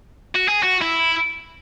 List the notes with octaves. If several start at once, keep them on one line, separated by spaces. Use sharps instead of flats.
F#4
G#4
F#4
E4